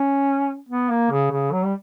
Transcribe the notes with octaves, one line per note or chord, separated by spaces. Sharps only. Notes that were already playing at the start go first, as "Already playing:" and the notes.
Already playing: C#4
B3
A#3
C#3
C#3
F#3
G3